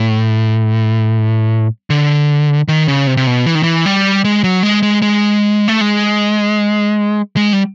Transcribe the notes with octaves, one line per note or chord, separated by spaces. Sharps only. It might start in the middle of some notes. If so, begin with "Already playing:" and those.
Already playing: A2
D3
D#3
C#3
C3
C3
B2
E3
D#3
E3
G3
G#3
F#3
G#3
G#3
G#3
A3
G#3
G#3
G3